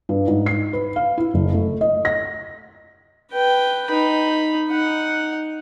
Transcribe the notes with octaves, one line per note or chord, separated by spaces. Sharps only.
G2
G#2
C7
B4
F5
E4
F#1
A3
D#5
A#6
B4 G5
D#4 B5
D#4 F#5